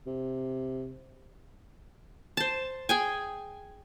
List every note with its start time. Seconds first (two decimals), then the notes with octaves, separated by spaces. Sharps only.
0.07 C3
2.37 C5 A5
2.89 G#4 G5 G#5